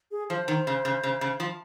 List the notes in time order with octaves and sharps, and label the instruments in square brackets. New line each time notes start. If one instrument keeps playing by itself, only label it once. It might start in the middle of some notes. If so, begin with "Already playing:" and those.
[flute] G#4
[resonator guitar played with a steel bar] F3 [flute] C5
[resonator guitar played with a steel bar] D#3
C#3
C#3
C#3
C#3
F3